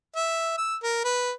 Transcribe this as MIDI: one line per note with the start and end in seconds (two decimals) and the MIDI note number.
0.16 0.54 76
0.58 0.76 88
0.83 1.00 70
1.04 1.32 71